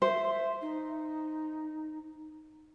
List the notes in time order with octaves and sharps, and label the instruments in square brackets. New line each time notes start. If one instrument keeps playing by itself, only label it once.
[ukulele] C5 [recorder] E5
[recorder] D#4